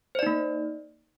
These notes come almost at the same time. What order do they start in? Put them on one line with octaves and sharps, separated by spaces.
C5 D5 D#4 A#3